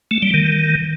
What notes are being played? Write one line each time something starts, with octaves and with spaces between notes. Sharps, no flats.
A3
G3
D#3